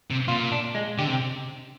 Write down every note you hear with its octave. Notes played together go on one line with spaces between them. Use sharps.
C3
A#2 F4
D4
G#3
D3 G4
C3